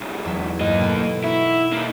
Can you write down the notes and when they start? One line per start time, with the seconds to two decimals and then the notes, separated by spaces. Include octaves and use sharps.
0.01 B1 G#2
0.25 E2 F#3 E5
0.61 G2 A#3 D#5
0.81 B2 A3 D#7
1.24 D#4 E4 F#4
1.72 D#3 A#3